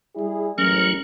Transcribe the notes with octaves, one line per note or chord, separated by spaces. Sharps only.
G3 E4 G#4
A1 F#3 C#4 A#4